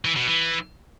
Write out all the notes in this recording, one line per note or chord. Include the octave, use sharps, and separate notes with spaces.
E3
B2
E3